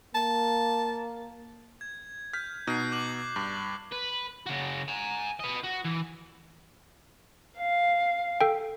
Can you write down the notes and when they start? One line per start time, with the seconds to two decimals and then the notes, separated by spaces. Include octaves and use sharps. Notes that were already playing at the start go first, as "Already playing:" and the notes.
0.15 A#3 A5
1.81 G#6
2.33 F6 G6 B6
2.67 B2 D#4 F#6 C7
2.92 D6 G6 F#7
3.36 G2
3.92 B4
4.46 C#3 F#4
4.88 G#5 A#5
5.40 B4 D#5
5.63 F#4
5.84 E3
7.58 F5
8.41 A4 G5